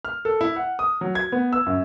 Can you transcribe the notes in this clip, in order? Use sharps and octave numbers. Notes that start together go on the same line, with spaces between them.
F6
A4
E4
F#5
D#6
F#3
G#6
B3
E6
F#2